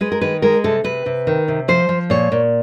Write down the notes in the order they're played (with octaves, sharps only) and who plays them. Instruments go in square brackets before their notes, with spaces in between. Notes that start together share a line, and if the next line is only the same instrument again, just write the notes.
[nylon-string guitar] G#3 B4
A#4
D#3 B4
G#3 A#4
C3 A4
C3 B4
C3
D#3
C3
F3 C5
F3
A#2 C#5
A#2